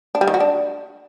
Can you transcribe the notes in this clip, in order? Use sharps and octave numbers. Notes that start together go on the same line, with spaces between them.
D4
G3
D#3
F#4
D4